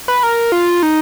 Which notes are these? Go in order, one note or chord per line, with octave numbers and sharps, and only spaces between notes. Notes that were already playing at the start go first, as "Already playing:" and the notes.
B4
A#4
F4
D#4